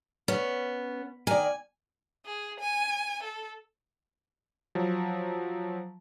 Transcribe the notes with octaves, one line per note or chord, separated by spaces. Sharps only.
B3 C#4
D#3 D5 G#5
G#4
G#5
A4
F3 F#3